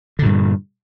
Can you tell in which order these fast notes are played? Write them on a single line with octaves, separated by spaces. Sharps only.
D3 A#2 G2